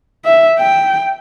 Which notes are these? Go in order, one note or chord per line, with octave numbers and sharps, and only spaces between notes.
E5
G5